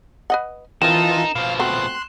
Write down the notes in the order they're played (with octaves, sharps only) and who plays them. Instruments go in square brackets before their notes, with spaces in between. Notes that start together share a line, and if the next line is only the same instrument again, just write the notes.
[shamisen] B4 D#5 F#5
[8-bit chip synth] E3 F4 A5 [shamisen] C4 A#4 [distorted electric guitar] D#4 [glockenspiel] E7
[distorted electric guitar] B2 F3 [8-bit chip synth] F5
[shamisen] A3 C4 F#4 [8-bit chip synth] C6 F#6